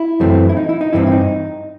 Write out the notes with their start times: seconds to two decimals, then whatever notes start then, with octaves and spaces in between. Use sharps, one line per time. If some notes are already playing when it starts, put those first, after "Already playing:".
Already playing: E4
0.20 F#2 E3 A3 C4
0.49 E4
0.57 D#4
0.69 E4
0.81 D#4
0.93 G2 E3 A3 C4 E4
1.07 E4
1.12 D#4